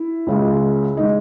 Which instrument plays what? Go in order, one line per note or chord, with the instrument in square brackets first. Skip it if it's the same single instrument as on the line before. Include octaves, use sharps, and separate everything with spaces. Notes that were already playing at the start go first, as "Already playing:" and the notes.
Already playing: [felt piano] E4
C#2 C#3 G#3
D#3 G#3 D#5